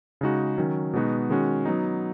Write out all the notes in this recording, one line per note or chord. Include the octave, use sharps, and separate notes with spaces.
C#3 G#3 D#4 F#4
D#3 F#3 C#4
B2 G#3 B3 D#4 F#4
D#3 G#3 C#4 F#4
F#3 B3 D#4